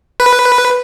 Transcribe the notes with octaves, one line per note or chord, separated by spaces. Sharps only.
B4